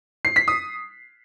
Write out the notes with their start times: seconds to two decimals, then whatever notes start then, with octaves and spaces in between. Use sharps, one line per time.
0.25 C7
0.36 B6
0.48 D#6